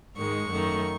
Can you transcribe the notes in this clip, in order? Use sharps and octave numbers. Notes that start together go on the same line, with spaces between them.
G#2 D#3 G#3 C#6
F#2 D#3 A3